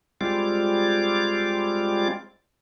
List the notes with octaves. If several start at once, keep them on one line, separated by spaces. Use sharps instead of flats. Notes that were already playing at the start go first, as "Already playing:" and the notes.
G3 G#3 C4 F4 D6